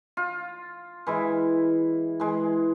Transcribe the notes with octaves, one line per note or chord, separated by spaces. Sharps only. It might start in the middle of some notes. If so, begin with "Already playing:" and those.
F4
E3 G#3 E4
E3 G#3